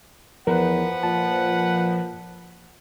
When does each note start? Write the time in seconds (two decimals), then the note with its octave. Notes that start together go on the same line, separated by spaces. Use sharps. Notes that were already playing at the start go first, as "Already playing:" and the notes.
0.47 E2 F3 A#4 B4 F#5
1.03 A#2 A5